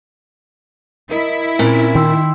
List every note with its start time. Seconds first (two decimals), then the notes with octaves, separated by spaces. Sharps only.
1.11 E4 A#4 D#5
1.59 A#2 C4 C#4
1.95 D#3 G5 C6 E6